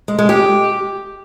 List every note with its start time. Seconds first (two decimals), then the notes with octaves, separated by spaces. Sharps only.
0.08 G#3
0.18 G#3
0.29 G4